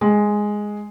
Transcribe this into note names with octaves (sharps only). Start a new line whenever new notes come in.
G#3